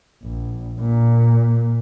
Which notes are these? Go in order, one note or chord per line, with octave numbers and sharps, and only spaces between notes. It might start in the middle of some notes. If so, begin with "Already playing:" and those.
A#1
A#2